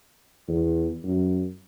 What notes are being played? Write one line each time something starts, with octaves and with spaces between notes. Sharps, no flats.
E2
F#2